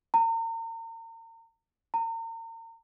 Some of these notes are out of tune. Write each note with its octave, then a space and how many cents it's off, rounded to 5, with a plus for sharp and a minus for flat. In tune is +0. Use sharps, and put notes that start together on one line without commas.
A#5 -40
A#5 -40